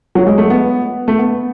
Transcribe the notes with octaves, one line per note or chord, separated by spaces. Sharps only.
F#3
G#3
A3
B3
A3
B3